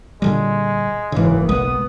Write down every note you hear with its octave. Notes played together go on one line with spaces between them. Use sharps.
A#2 D3 G3 G#3
F#1 G#2 C#3 E3
B1 G#3 B3 D#6